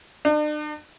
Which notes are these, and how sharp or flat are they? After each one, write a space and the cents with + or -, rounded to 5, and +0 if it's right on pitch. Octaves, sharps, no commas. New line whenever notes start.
D4 +45